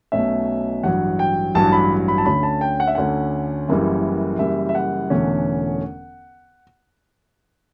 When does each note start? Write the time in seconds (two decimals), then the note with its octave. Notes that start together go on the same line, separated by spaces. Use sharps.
0.12 B1 B2 A3 C#4 E5
0.83 A1 G2 F#3 F#5
1.19 G5
1.55 A1 G2 F#3 A5
1.72 B5
2.08 B5
2.18 A5
2.26 D2 D3 A3 C#4 B5
2.43 A5
2.61 G5
2.80 F#5
2.87 E5
2.95 D2 D3 A3 C#4 F#5
3.69 F#1 F#2 C#3 E3 G3
4.39 F#1 F#2 C#3 E3 G3 E5
4.69 E5
4.75 F#5
5.10 E1 E2 D3 A3 C#4